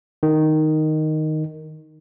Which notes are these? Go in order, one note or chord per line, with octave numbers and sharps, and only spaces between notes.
D#3